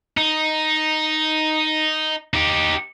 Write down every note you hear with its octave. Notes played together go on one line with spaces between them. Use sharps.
D#4
D#4 G4